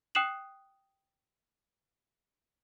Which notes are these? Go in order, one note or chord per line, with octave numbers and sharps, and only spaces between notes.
G5 D#6 F#6 C7 E7 F#7